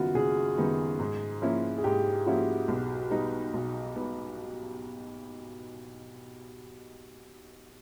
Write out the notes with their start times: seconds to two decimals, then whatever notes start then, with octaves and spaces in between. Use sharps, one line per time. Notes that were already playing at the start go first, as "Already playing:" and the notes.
Already playing: F#1 F#2 D#3 G3 B3 F4 F#4
0.15 F#1 G#4
0.57 F#2 D#3 G3 B3
0.99 G#2
1.42 F3 A#3 C#4 E4
1.78 G#4
1.84 G#2 G4
2.26 F3 A#3 C#4 E4 F#4
2.68 B1
3.10 B2 G3 B3 D#4
3.53 B1
3.95 B2 G3 B3 D#4